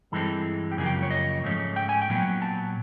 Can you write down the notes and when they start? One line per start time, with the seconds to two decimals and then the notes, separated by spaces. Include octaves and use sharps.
0.12 G2 E3 G#3 C4 A4
0.71 G4
0.77 F#2 C#3 F3 A#3 G#4
0.86 G4
1.03 C#5
1.11 D#5
1.44 G#2 F3 A3 C#4
1.76 G5
1.89 G#5
2.02 G5
2.09 A#2 F#3 B3
2.42 A5